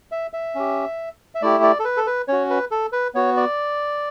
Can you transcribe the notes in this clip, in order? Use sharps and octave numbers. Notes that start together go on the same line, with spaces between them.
E5
E5
C#4 G4
E5
A3 E4 G4 D5
D5
A4
B4
A4
B4
C#4 F#4 C#5
B4
A4
B4
B3 F#4 C#5
D5